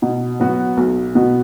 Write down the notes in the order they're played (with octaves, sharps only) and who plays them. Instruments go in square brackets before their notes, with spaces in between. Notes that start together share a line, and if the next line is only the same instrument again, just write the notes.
[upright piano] B2
F#3 B3 F#4
B1
B2 B3 F#4